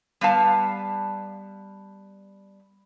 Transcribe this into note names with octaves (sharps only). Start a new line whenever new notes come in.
G3 B3 F5 A5